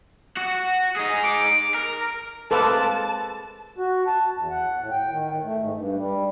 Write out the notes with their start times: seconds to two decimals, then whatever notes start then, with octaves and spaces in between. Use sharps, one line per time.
0.37 F#4
0.97 D#4 G#4
1.24 D6
1.74 A#4
2.51 G#3 A#3 C4 A4 B4 A5
3.78 F#4
4.07 A5
4.34 E2
4.51 F#5
4.79 A2
4.92 G5
5.10 D#3
5.31 A2
5.44 A3
5.58 G#2
5.75 G2
5.97 G3